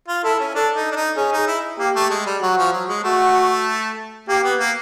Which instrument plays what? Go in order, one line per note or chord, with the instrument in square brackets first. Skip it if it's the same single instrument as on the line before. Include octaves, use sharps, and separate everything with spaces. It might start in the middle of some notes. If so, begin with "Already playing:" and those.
[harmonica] F4
[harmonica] E4 [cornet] A4
[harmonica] C#4
[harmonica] D4 [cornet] A4
[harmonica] D#4
D4
D#4
[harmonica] C#4 [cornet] G#4
[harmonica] D#4
E4
[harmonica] A#3 [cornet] G4
[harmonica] A3
G#3
G3
[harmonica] F#3 [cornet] F#4
[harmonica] F3
F#3
G#3
[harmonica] A3 [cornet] F#4
[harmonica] A#3 [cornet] G4
[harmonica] B3
A#3